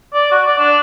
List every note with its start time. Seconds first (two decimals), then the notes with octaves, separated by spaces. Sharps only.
0.14 D5
0.31 F#4
0.47 D5
0.59 D4